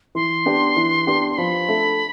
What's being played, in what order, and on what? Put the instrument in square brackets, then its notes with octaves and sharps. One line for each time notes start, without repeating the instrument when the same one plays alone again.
[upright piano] E3 [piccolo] C6
[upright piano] B3 D4 G4
E3
B3 D4 G4
[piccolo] C6
[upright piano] F3 [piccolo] B5
[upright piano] A3 D4 A4 E5